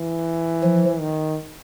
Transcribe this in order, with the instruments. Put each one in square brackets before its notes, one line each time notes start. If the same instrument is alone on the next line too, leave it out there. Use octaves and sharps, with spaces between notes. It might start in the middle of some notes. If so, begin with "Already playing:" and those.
Already playing: [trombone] E3
[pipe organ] F3
[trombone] D#3